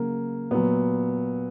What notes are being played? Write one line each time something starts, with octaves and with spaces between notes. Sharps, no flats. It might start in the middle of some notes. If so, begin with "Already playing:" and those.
Already playing: C#3 F#3 A#3
A#2 F#3 B3